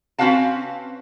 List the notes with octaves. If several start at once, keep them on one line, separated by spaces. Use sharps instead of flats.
C4 C#4 F#4 B4 F5 A5